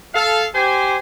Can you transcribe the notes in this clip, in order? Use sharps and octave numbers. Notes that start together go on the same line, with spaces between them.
A4 F5
G4 C5 G#5